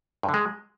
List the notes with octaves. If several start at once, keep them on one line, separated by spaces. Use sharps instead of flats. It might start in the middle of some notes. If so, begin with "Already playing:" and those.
G2
D3
G#3